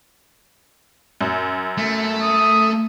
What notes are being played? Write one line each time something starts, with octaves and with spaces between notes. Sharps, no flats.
F#2
A3
D#6